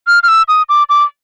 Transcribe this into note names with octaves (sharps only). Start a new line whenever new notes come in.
F6
F6
E6
D#6
D6
D6